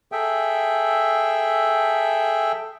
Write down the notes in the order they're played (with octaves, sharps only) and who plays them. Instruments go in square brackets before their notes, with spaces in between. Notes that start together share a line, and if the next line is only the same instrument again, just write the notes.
[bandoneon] G#4 A4 E5 G5